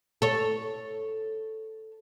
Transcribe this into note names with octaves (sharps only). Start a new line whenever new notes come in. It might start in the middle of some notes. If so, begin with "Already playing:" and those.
A4 C#5